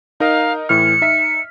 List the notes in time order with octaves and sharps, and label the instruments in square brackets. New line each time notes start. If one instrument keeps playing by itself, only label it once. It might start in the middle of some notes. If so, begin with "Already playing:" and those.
[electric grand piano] D#4 A#4 D#5 [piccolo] F5
[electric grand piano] A2 E3 F6 [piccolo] C#7
[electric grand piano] D#4 E5 B6